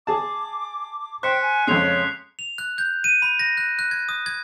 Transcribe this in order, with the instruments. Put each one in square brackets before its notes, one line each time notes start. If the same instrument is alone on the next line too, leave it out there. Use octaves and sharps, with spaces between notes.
[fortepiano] G#4 A5 [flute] D6
[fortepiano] C5 [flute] G5 [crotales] F#6 B6 C#7
[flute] G#5
[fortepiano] F2 C#3 G#3 [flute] C#5 [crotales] F#6 C7 F7
[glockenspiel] F7
F#6
G6
D#7
B5
A#6
F#6
F#6
G#6
D#6
G#6